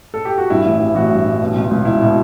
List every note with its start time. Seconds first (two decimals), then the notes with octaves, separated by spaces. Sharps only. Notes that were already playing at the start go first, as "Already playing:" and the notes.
0.14 A4
0.25 G4
0.38 F#4
0.50 G2 E4
0.66 A1
0.80 E3
0.95 A1 F#4
1.11 G2
1.26 A1
1.41 B2
1.56 C#2
1.71 C#2
1.85 B2 E4
2.01 B2